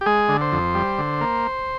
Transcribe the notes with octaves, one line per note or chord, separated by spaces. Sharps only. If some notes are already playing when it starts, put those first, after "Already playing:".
G4
G#3 G#4
D3
C5
F2
G3
D3
A#3